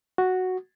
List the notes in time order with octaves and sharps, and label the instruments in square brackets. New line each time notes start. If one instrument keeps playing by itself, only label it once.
[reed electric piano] F#4